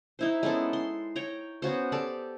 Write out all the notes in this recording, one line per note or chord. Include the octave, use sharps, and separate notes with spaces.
D#4 E4 C5
G#3 B3 C#4 A4
C6
C#5 G5 A#5
B3 C#4 F#4 C5
G4 A4 D5